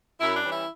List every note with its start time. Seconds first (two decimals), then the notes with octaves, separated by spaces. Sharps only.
0.20 F#2 E4
0.36 D4
0.44 E3 G3 C#4
0.52 E4